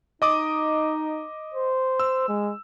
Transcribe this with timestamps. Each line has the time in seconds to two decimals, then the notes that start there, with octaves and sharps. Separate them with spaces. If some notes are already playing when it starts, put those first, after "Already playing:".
0.22 D#4 D#5 D6 D#6
1.54 C5
2.00 E6
2.28 G#3